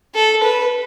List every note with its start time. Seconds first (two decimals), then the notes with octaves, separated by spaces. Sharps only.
0.15 A4
0.43 B4